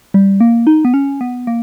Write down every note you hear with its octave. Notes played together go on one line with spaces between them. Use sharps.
G3
A#3
D#4
B3
C#4
B3
A#3